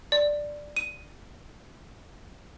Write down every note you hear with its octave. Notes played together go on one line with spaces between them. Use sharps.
D5
D#7